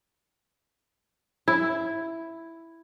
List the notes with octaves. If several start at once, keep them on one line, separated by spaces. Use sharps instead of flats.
E4